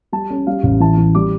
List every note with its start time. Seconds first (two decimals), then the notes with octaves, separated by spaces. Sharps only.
0.13 G3 A5
0.30 C#4
0.47 G3 F5
0.63 A1
0.80 E3 A5
0.97 E3
1.15 G3 D6